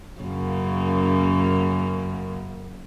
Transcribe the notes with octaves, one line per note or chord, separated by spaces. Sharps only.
F#2 C#3 A#3